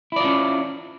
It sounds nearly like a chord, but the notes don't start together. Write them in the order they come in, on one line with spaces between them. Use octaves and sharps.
E4 D5 F4 C#4